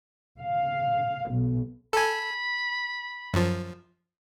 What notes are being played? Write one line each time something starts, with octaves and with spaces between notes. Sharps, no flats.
F5
B1
A4 G#5 B5
F#2 F3